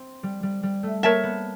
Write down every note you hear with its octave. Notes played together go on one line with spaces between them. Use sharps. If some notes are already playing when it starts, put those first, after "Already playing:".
Already playing: C4
G3
G3
G3
A3
A#3 A#4 C#5 E5 A5
B3